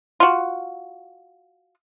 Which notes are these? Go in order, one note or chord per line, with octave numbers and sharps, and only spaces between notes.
F4 F#4